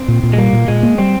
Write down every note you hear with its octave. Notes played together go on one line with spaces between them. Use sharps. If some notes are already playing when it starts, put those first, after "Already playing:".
Already playing: C4
A#2
A#2
G#3
G3 A#3
A#2
A#2 G#3
A#3
G3 C4